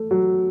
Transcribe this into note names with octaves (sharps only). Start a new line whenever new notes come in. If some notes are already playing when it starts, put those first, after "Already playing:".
Already playing: A3
F#3